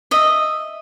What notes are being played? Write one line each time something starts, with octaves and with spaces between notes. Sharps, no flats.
D#5 E5